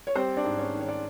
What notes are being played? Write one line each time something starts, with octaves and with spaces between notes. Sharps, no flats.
C#5
G3 C4 C5
D4 D5
G#2
C#4 C#5
D#3
C#5
D5